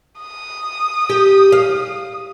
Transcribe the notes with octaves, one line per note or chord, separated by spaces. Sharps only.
D#6
G4
F5